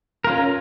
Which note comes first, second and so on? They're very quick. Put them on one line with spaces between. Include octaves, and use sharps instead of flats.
A#4 F4 C#4